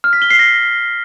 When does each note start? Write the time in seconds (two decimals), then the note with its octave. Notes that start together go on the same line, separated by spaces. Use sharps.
0.04 F6
0.13 B6
0.22 G7
0.30 C7
0.39 A#6